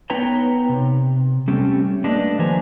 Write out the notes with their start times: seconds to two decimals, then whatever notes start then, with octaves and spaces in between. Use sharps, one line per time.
0.10 B3 D#4 B4 C#5 G5 A#5
0.69 C3
1.48 G3 A3 C4 C#4 G4 A4
2.04 A3 A#3 D4 G4 B4 D#5
2.39 D#3 F3 B4 C5 G#5 A#5